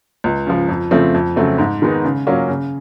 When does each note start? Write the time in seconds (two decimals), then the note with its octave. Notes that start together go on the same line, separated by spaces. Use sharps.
0.24 C#2
0.47 C#3 F3
0.69 F2
0.91 C#3 F3 A3 C4
1.14 F2
1.36 C#3 F#3 A3 C4
1.58 G#2
1.82 D#3 G#3 B3 D#4
2.04 C#3
2.27 F#3 A#3 C#4 F4
2.48 C#3